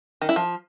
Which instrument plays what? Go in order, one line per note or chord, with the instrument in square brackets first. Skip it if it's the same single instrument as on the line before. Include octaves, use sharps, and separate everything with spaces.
[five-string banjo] D#3
E4
F3